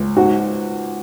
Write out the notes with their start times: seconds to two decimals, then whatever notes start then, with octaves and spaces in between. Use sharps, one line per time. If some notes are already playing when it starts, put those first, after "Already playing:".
Already playing: C#2
0.16 G#2 F#4